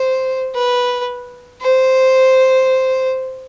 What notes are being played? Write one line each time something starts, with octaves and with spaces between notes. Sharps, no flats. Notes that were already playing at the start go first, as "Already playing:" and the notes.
Already playing: C5
B4
C5